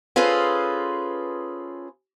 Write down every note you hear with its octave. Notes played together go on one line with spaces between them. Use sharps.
C#4 F4 G#4 A4 B4 C5